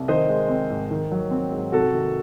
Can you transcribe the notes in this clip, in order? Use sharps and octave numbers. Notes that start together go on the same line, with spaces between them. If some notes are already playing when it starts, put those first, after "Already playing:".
Already playing: C2
D#3 C5 D#5
G#3
C4
G#2
D#3
F#3
C4
G#2
C3 F#4 A4
D#3